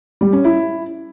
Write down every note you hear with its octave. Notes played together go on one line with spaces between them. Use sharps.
G3
C#4
E4